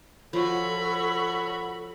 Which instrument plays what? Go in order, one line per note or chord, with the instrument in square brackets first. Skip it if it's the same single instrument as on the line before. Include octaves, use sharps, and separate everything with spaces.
[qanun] F3 [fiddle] F#4 C#5 [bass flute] A4 [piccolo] B5